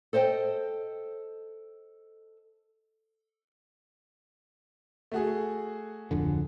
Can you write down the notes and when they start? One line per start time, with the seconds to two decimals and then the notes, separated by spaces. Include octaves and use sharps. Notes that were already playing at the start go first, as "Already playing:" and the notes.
0.13 A4 C5 D#5 F5 G5
5.12 A3 F#4 G#4
6.11 D1 F2 D3